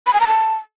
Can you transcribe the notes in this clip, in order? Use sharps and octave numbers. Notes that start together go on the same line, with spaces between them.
B5
G#5
A#5
A5